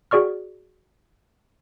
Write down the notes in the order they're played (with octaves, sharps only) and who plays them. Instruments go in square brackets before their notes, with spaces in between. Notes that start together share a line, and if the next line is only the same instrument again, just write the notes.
[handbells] F#4 G#4 D5 C#6 F6